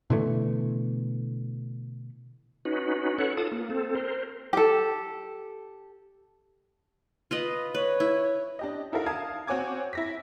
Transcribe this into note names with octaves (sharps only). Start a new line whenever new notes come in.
B2 D3 E3 A3
C#4 D#4 F#4 B4
A4 B4 C#5 F#5
F4 A4 A5 D#6
A#3
C4 A4
A#4 C5
G4 A4
F4 B4 D#5
B4 C#5
E4
D4 G4 D#5
D#4 E4 F#4 A4 A#4 F5
F5 A5 D#6 G#6
C4 F#4 C#5 G#5 D6 G#6
E4 A#6 B6